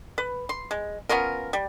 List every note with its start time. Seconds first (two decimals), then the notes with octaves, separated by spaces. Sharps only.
0.18 B4
0.49 C6
0.71 G#3
1.09 B3 C#4 F4 A#4
1.53 G3